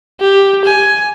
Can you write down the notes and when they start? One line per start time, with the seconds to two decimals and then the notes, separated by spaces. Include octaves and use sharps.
0.20 G4
0.65 G#5